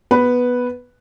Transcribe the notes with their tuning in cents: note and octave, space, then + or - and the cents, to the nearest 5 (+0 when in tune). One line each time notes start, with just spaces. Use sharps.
B3 -5 B4 +0